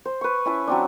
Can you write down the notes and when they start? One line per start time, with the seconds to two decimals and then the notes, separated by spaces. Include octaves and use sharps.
0.05 C5
0.21 B4 C#6
0.45 C#4 E4 A5
0.67 F#3 C4 D4